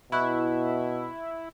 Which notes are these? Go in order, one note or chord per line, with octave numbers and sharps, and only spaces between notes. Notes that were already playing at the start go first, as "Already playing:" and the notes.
B2 E4 B5 C#6 F#6